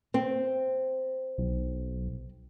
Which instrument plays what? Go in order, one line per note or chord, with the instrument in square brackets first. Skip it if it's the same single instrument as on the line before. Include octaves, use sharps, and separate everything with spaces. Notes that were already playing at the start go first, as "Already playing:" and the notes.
[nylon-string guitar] C4
[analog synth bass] B1